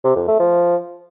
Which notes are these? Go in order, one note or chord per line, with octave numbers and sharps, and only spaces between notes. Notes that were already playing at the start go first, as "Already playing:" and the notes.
C3
F2
A3
F3